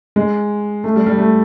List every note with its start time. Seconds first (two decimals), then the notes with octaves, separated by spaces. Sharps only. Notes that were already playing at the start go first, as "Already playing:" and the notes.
0.16 G#3
0.84 A3
0.95 G3
1.06 G3
1.18 A3